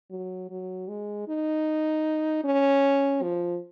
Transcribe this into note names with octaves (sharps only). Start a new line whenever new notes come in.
F#3
F#3
G#3
D#4
C#4
F3